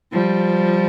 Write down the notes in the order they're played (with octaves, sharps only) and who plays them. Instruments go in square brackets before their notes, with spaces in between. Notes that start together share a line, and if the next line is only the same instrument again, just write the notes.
[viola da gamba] F3 G3